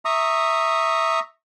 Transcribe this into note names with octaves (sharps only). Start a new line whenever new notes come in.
E5 A#5 C#6 D#6